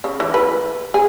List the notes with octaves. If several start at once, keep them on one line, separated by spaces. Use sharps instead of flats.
C#3
E3
B4
G#4